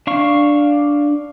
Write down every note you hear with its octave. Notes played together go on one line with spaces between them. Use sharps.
D4 F5 C#6